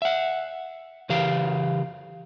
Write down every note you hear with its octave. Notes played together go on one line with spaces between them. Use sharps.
E5 F#5
C#3 E3 G4 F5